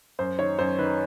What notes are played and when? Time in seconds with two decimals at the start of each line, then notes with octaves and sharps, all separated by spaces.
0.19 F#2 C5
0.39 D#3 C#5
0.59 F#2 C5
0.79 D#3 B4